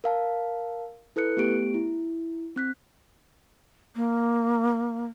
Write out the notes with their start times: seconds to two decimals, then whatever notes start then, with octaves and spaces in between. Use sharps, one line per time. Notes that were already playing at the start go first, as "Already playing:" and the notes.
0.04 A#4 F5 A5
1.16 E4 A4 B4 F#6 C#7
1.37 A3 B3 G4 D7
1.74 E4
2.56 C4 F#6 B6
3.96 A#3